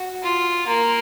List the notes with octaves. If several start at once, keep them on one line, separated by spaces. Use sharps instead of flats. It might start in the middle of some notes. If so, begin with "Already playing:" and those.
Already playing: F#4
F4
A#3